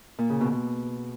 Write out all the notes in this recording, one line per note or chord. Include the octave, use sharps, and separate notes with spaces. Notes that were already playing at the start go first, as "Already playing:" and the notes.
A#2
C#3
B2
B2